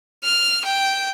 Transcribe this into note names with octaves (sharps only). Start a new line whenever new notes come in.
F6
G5